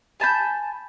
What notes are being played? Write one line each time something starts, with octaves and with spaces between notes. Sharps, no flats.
G#5 A5 B5 G6